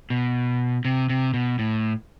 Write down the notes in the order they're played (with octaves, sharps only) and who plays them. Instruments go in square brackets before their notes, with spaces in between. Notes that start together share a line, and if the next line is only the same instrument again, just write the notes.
[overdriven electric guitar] B2
C3
C3
B2
A2